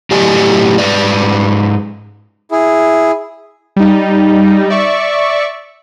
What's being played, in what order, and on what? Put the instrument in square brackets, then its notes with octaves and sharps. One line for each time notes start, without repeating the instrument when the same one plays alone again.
[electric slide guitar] A2 F#3 G4 D5 D#5 G#5
G#2 B4 D5
[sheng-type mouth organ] E4 G#4
[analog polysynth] G3 D#4
D5 E5 C#6